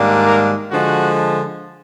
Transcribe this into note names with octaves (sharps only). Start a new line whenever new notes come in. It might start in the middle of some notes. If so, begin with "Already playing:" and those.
Already playing: G#2 D#3 G3 A#3 D4
A#4
D3 F3 G#3 F#4